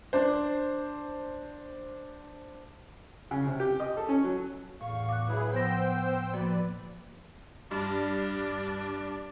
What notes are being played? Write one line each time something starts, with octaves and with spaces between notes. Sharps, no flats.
D4 C5
C#3
C3
G4
D#5
A4
C#4
F#3
E2 A2 F5 C#6
D6 F#6
F#3 E4 G#4 B4
F3 B3 C5 G5 E6 A#6
F3 A#3 F#4 B4 D5
G2 D4